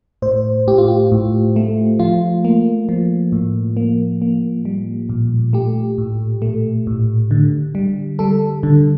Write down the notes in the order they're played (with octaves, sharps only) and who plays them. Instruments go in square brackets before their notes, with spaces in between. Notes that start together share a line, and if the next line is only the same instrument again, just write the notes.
[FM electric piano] A2 C5
A2 G4
F4
G4
A2
A3
F3 F4
A#3
F3
A2
A#3
A#3
G3
A#2
A3 G4
A2
A3
A2
D3
G3
G3 A4
D3